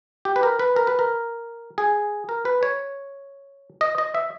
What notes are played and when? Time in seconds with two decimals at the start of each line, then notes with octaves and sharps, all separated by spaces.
0.25 G4
0.36 B4
0.43 A#4
0.59 B4
0.76 A#4
0.87 B4
0.99 A#4
1.78 G#4
2.29 A#4
2.45 B4
2.63 C#5
3.81 D#5
3.98 D#5
4.15 E5